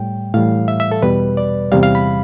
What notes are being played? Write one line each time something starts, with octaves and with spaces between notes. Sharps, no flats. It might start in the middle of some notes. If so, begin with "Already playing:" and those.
Already playing: A2 G3 G5
A2 E3 G3 F5
E5
E5
A4
E2 B2 G3 B4
D5
E2 C3 G3 F5
F5
B5